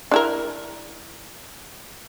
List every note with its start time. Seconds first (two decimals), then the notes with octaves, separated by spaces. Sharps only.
0.11 D4 E4 A#4